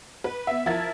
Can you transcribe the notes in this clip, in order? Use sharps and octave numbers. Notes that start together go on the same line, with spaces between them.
B4
B3 E5
F3 E4 A#4 E5 G#6 A6